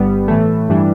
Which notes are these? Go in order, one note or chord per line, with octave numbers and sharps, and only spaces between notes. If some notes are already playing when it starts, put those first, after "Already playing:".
Already playing: G1 G2 G3 B3
A2 E3 A3
G2 E3 G3 D4